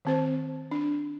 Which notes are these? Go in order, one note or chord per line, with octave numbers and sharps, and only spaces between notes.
D#3 C4 C5
D4